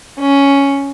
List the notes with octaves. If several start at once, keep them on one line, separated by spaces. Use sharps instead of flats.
C#4